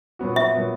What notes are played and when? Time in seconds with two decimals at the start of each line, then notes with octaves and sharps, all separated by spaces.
0.19 A#2 F#3 B3 F#4
0.36 E5
0.54 A#2 F#3 B3 F#4